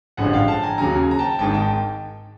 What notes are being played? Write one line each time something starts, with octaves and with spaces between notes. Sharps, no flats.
A1 G2 D3 F3 G#3 F#5 G#5
F5 G5
G5 A5
G#5 A#5
D#2 C#3 F#3 G#5 A#5
A#5
G5 A5
G#1 G#2 D#3 G5 A5
G5 A5